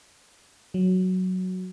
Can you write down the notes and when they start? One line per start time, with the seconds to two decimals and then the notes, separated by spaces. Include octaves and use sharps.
0.74 F#3